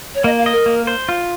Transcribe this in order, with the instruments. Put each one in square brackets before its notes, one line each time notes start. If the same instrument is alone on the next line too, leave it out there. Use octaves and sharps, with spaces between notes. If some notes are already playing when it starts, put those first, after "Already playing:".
[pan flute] C#5
[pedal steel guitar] A#3 [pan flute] D#5
[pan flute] F5
[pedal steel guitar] D#5
[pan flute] A#4
[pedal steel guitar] A#3
C5
F4